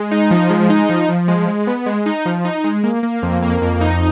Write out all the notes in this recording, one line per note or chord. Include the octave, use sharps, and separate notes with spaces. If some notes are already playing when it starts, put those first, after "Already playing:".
Already playing: G#3
D#4
F3
G#3
D#4
F3
F3
G#3
G#3
B3
G#3
D#4
F3
D#4
G#3
A#3
A#3
F2
A#3
F2
D#4